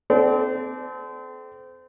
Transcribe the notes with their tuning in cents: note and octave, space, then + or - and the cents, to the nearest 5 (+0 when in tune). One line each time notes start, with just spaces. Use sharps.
C4 -30 A4 -40 D5 +0